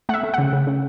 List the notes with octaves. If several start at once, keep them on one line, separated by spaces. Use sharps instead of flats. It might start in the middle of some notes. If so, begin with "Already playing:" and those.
A3 E5 F#5
A3
C#3 F#5
C#3
C#3